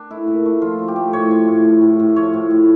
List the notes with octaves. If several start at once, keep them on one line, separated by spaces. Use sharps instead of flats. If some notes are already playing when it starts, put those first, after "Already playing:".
Already playing: D4
A3 E4
A#2
A3
F3 F4
F3
G4
A3
A2 C#5
F3
A2
A2
A2
A2
F3 C#5
A2
A2